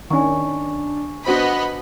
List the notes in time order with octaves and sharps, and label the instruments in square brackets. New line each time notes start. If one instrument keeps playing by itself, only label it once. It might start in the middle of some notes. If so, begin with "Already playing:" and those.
[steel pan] D#3 C#4 [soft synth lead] D4 [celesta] G#5 C#6
[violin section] B3 D#5 B5 [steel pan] D4 F#4 C5 [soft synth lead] F#5